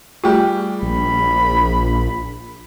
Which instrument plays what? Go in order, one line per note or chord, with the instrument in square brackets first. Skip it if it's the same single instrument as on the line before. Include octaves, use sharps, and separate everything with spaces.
[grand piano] G3 G4 G#4 [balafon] A3 F4
[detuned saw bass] A#1 [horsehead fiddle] B5